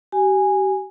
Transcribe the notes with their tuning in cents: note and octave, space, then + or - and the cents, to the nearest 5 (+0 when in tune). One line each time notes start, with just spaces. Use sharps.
G4 -35 G#5 -10